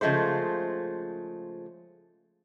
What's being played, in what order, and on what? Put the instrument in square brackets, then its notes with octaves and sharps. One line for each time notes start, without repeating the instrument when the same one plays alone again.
[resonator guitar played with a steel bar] C#3 F3 G#3 A3 C5